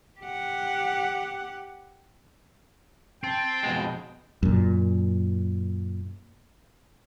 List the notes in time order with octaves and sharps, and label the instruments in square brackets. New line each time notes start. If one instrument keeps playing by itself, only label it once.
[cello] G4 F#5
[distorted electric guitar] C4 [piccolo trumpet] G5 [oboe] A5
[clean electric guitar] F2 B2 G#3
[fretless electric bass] F#2 A#2